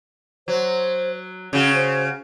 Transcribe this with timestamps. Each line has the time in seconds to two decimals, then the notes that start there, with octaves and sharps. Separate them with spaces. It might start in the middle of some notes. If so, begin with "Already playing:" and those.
0.48 F#3 C5
1.53 C#3 C#4 F#4
1.74 C5